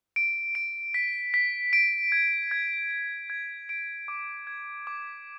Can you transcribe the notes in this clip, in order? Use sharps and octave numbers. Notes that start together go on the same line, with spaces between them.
D7
D7
B6
B6
D7
G#6
G#6
D7
G#6
D7
D6
G#6
D6